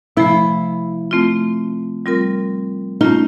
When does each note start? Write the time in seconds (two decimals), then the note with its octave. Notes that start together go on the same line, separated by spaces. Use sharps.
0.17 C3 F3 A3 E4
1.11 A3 C4 F4
2.06 G3 C4 F4 A#4
3.01 A3 C#4 D#4 F4